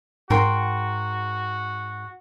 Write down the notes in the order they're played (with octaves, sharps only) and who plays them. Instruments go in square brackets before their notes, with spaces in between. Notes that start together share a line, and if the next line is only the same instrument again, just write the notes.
[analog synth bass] G#2 [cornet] F#4 [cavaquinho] A#4 G5 C6